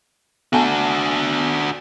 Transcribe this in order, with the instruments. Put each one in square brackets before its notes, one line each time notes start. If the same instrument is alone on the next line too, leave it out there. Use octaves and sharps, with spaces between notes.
[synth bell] B3 G#5 A5 [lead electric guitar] D4 F#4